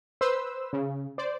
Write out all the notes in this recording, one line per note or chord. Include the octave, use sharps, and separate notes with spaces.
B4 C5 E6
C#3
C5 D5